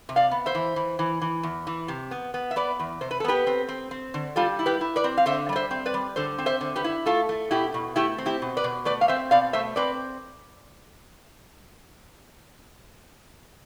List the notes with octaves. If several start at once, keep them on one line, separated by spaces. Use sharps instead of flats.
C3
D5 F5
B3
C5 E5
E3
E3
E3
E3
E2
E3
C3
B3
B3
E5
B3 B4 D5
E2
C3 C5
B4
A4
B3 G4 B4
C4
C4
C4
D3
G3 F4 A4
E4
G4 B4
E4
B4 D5
C4
F5
D3 C5 E5
G3 D5
C5 E5
C4
B4 D5
G3
D3 A4 C5
C4
C5 E5
D3
G4 B4
E4
A3 F4 A4
A3
B2 E4 G4
B2
A3 E4 G4
C4
E4 G4
B2
B4 D5
B2
A3 B4 D5
F5
C4 C5 E5
B2 D5 F5
A3 C5 E5
C4 B4 D5